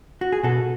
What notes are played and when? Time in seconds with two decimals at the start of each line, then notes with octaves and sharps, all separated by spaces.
0.21 F#4
0.32 G#4
0.43 B2 F#4 A4